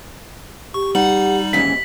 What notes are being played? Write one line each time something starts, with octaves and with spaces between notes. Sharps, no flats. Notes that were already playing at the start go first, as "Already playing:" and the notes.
G4 C#6
G3 D#4 F#5 F#7
D#2 G#2 E3 C#4 B6